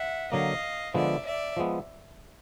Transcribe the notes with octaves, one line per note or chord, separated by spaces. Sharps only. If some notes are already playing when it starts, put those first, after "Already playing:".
Already playing: E5 F#5
D3 F#3 A#3 D#5 F5
D3 F3 G#3 B3 D5 E5
D5 E5
F3 G#3 B3